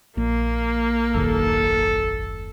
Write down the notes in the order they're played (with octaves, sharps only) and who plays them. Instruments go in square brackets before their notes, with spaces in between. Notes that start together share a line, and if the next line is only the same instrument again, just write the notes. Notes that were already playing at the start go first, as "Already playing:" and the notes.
[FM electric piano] A#1 [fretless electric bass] A#2 [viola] A#3
[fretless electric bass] F#1 D#2 A#2 [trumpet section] A4